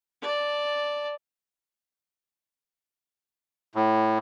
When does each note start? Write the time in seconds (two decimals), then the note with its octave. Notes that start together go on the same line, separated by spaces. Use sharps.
0.21 D5 A5
3.75 A2